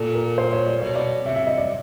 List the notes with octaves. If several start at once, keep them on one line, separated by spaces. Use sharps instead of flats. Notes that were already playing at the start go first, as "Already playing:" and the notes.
Already playing: A#2 A4
A#4
C5
C#5
D5
B2 C#5
D5
C3 E5
E5
D#5
D5